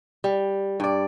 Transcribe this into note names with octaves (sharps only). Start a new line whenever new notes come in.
G3
G2 D5